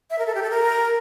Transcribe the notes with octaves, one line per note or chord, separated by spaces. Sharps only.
E5
A#4
A4
G4
A4
A#4